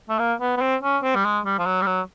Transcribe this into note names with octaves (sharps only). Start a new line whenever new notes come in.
A3
A#3
B3
B3
C4
C#4
C4
G3
G#3
G3
F3
F#3
G3
F#3